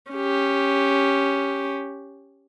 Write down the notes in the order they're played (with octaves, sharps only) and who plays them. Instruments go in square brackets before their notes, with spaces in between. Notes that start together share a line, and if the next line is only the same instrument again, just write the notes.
[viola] C#4 G4